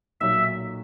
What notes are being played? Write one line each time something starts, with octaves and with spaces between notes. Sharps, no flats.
B1 A#2 F#3 E5